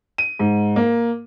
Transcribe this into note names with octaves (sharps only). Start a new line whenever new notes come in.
D#7
G#2
A#3